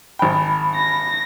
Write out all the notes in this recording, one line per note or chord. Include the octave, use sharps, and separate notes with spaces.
G#1 G5 B5
A#6